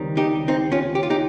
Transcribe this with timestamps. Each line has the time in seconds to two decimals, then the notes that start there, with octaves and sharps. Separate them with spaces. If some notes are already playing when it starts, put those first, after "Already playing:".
Already playing: C#2 C3 D#3 G3
0.17 D#4 G4
0.48 C4 D#4
0.72 C#4 F4
0.95 G4
1.03 F4
1.10 D#4 G4